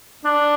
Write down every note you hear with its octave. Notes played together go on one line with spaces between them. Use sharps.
D4